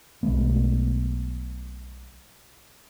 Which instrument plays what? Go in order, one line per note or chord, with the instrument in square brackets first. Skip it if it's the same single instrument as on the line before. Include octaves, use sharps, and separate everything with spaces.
[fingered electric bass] B1 G#3 A3 B3